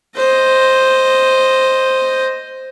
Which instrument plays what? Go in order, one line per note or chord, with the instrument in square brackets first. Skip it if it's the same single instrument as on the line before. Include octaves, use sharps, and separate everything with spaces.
[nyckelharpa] C5 D#5